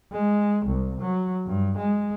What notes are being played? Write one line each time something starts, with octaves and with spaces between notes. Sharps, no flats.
G#3
C2
F#3
G2
G#3